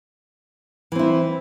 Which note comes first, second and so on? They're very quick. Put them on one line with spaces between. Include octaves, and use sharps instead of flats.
E3 C4 E4